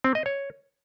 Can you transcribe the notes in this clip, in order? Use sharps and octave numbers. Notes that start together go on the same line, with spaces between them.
C4
D#5
C#5